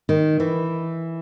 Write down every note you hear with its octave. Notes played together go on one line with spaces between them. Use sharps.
D#3
E3